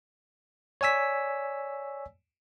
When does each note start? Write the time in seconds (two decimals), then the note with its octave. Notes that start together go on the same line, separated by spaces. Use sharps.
0.81 C#5 D5 G#5 E6 B6